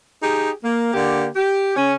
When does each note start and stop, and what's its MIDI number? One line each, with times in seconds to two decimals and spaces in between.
0.23 0.51 63
0.23 0.51 67
0.23 0.51 68
0.64 0.90 58
0.93 1.26 50
0.93 1.26 58
0.93 1.26 67
1.35 1.75 67
1.76 1.93 49
1.76 1.93 61